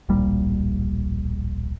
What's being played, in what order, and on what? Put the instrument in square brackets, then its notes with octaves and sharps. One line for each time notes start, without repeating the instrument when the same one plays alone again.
[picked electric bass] D1 A#1 A#2 G3